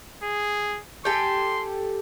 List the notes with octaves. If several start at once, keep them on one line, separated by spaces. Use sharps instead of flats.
G#4
G4 A4 G#5 C6